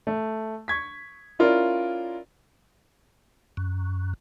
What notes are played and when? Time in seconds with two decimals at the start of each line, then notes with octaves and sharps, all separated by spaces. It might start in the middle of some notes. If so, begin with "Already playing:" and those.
0.07 A3
0.68 C#6 G#6 B6
1.39 C#4 E4 F4 A#4 D5 F5
3.57 F#2